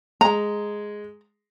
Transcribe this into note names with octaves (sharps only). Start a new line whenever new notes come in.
G#3 A#5